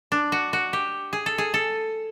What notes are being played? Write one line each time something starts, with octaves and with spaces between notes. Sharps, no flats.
D4
F#4
F#4
G4
G#4
A4
G#4
A4